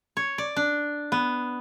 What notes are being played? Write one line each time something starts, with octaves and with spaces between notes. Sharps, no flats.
C#5
D5
D4
B3